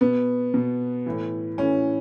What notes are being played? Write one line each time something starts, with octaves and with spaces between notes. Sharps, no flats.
B2 B3
B2
A2 E3
A2 E3 C#4